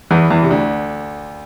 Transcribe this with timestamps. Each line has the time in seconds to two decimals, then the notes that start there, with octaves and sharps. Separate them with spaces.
0.11 E2 E3
0.30 E2 E3
0.43 C3
0.50 D2 D3